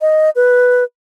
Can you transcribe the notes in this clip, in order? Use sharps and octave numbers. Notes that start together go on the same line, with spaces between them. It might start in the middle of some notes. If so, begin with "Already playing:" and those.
D#5
B4